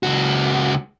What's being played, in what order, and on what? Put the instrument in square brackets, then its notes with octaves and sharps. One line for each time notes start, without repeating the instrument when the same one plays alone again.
[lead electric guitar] C#2 F#4